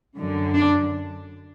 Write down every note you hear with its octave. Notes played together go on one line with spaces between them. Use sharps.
F#2 D3
D4